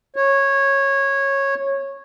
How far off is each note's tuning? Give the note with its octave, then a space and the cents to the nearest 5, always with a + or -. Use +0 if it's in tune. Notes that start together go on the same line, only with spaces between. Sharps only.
C#5 -15